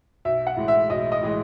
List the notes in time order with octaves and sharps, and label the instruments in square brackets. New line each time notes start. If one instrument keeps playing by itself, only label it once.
[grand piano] B1 [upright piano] E5
[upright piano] F#5
[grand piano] A2 E3 G#3
[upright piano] E5
[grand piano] B1 [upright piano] D#5
[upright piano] D#5
[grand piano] A2 E3 G#3